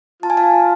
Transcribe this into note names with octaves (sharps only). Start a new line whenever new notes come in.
F4 A5
G#5
F5 A5